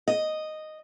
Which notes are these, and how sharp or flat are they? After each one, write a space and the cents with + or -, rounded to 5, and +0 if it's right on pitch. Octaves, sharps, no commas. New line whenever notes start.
D#5 -5